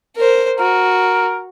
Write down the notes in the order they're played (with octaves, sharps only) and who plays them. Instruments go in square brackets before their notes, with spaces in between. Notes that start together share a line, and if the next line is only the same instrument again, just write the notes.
[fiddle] A#4 C5
[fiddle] F#4 [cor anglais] A#4